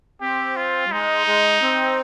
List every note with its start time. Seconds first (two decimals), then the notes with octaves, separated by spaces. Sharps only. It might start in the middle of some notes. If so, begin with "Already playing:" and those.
0.21 C4 G4
0.56 F4
0.86 G3
0.92 G#3 D#4
1.27 G#3
1.62 C4